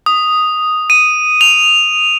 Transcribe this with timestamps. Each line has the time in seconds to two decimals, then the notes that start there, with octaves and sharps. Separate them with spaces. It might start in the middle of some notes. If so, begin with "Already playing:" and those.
0.06 D#6
0.90 D#7
1.41 F7